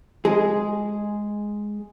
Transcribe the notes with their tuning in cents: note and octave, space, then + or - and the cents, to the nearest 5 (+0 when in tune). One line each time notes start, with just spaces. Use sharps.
G#3 +0 G#4 +0